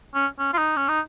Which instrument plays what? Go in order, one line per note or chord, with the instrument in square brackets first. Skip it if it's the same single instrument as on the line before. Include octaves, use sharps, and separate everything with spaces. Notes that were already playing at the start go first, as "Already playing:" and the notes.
[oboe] C#4
C#4
F4
D#4
C#4
D#4